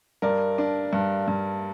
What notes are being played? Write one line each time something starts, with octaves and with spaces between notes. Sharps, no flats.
G2 A#4 D5
D4
G2
G2